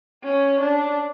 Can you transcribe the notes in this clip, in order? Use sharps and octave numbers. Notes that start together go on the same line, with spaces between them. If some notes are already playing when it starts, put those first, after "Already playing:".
C#4
D4